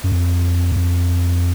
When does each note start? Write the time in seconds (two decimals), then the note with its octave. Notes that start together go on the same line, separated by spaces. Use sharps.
0.04 F#2
0.12 F2
0.72 E2
0.76 F2